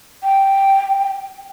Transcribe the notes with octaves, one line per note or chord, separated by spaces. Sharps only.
G5